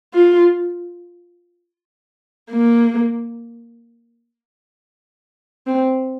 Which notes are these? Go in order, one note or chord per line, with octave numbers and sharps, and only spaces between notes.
F4
A#3
C4